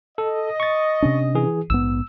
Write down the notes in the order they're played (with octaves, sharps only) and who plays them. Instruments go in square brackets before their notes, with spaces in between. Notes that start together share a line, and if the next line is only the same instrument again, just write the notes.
[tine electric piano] A4 [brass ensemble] D#5
[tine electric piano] C#6 A6
[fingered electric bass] C3 C#4 D4
[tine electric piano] E3 G#4
[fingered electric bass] A#1 G#2 B3 [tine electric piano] E6